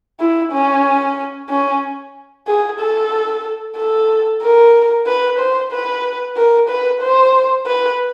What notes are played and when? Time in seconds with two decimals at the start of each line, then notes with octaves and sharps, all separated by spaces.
0.20 E4
0.52 C#4
1.49 C#4
2.47 G#4
2.79 A4
3.76 A4
4.42 A#4
5.07 B4
5.39 C5
5.72 B4
6.36 A#4
6.68 B4
7.02 C5
7.66 B4